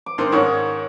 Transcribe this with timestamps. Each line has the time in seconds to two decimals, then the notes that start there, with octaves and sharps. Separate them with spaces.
0.06 D6
0.18 G2 D#3 C4 C5
0.32 G#2 D#3 C#4 C#5